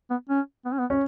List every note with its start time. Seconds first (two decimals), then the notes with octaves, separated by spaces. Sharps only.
0.10 B3
0.29 C#4
0.65 B3
0.72 C#4
0.79 B3
0.90 C#4